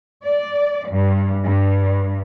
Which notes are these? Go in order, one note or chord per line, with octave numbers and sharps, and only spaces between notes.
D5
G2
G2